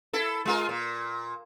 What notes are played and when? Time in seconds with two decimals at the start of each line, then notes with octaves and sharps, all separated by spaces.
0.13 E4 A4
0.45 G#3 F4 A#4
0.69 A#2